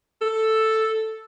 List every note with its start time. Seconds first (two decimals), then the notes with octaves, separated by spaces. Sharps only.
0.22 A4